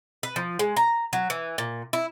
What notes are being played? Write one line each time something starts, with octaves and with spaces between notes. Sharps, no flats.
B4
F3
G#3
A#5
F#3
E3
A#2
E4